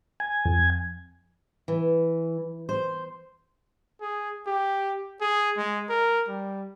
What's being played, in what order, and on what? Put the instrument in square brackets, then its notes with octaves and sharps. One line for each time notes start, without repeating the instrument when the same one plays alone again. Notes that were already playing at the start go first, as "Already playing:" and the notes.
[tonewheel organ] G#5
[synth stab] F2
[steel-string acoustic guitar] E3
C5
[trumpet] G#4
G4
G#4
G#3
A#4
G3